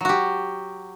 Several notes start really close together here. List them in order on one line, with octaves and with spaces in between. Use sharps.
F#3 F#4 G4